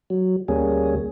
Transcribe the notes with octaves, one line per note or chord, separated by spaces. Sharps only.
F#3
D2 G3 A#3 C#4 G#4